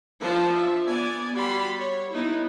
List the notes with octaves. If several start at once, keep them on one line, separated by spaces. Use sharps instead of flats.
F3 D4 F4 C5 A5
E5
B3 D5 G#5
G3 F#4 B5 C6
C#5
B3 D#4 E4